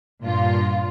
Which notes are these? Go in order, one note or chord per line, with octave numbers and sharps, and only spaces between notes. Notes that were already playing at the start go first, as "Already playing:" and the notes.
G2 A#2 F4